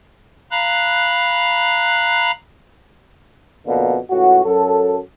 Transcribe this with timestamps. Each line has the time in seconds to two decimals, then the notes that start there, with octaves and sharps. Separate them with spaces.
0.51 F5 A#5 B5 F#6
3.67 F2 B2 D3 A#3
4.10 C#2 A2 F#4
4.45 F#2 F#3 A4